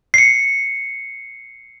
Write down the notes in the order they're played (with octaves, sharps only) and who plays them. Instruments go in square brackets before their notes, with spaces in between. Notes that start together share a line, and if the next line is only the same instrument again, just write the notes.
[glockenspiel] C7 C#7